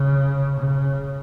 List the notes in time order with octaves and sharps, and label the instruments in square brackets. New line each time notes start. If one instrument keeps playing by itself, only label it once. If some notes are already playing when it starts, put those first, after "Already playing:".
Already playing: [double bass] C#3
C#3